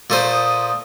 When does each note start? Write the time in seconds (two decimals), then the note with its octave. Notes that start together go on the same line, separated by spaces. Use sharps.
0.10 A#2 A3 C5 D#6